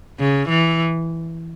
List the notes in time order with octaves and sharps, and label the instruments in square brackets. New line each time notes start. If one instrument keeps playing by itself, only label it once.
[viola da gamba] C#3
E3